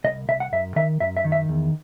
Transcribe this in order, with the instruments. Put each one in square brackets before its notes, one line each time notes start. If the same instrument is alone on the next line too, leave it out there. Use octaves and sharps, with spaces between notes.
[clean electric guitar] C2 D#5
C2 E5
F#5
F#2 E5
D#3 E5
F#2 E5
E5
D#3
E5
E2